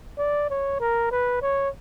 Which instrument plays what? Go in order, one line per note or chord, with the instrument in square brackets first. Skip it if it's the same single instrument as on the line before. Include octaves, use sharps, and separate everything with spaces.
[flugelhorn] D5
C#5
A#4
B4
C#5